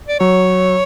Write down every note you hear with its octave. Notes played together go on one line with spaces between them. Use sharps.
D5
F#3 C#5